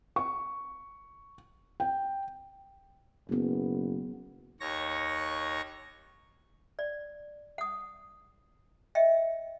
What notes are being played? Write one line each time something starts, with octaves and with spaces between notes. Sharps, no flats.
C#6
G5
F#1 F#3 B3
D#2 C#5 C#6 A#6
D5
F#5 D#6
D#5 E5 G5